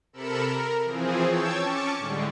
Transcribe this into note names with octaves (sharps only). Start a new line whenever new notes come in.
C3 A4 A#4 B5 C#7 E7
A#4
E3 F3 C4 G#4
C#5 G5 A5 E6 G#6
C#4 A5 C#6 D6 C#7
A2 D3 G3 G#3